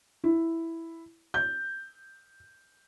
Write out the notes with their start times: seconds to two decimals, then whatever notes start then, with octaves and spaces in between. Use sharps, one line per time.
0.24 E4
1.34 G6